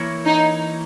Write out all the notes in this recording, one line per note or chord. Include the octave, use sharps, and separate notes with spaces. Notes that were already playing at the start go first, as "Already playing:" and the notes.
Already playing: E3 A#3 E4 A#4 C#5
D#4